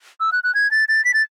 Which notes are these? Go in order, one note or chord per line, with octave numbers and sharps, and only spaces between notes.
E6
F#6
F#6
G#6
A6
A6
B6
A6